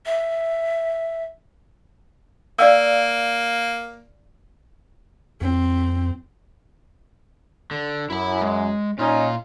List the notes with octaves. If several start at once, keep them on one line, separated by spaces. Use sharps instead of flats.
E5
A#3 D5 F5 E6
F2 C4
D3
F#2 E4 B5
G#3
A#2 C#4 D#4 F4